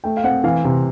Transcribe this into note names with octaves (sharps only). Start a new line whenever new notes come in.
A3 G5
F5
C4 F#5
E3 F5
C3